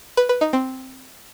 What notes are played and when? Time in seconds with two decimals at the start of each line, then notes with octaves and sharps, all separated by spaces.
0.17 B4
0.29 B4
0.41 D#4
0.53 C4